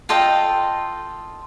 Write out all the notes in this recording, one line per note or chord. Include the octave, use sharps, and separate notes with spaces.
F4 A4 D#5 G5